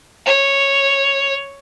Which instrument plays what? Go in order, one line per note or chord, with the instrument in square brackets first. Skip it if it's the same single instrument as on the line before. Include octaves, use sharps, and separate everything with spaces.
[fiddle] C#5